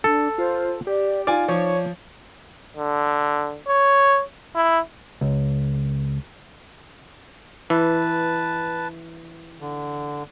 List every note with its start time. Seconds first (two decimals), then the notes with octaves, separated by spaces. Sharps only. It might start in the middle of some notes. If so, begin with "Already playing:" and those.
0.04 D4 A4
0.38 F4 C5
0.87 G4 D5
1.27 D#4 F4 D5 G#5 D6
1.48 F3 C#5
2.77 D3
3.67 C#5
4.55 E4
5.21 C#2
7.70 E3 B4 A5
9.60 D3